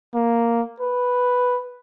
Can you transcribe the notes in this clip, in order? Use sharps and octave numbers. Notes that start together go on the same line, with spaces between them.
A#3
B4